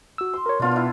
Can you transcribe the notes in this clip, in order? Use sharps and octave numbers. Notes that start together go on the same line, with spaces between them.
F#4 E6
C6
A#4 C#5
B2 B3 D4 F4 F5
D4 E4